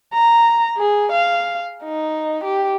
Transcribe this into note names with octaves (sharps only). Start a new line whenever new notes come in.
A#5
G#4
F5
D#4
G4